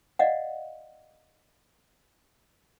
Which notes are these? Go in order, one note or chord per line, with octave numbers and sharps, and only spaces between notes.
D5 D#5 F5 F#5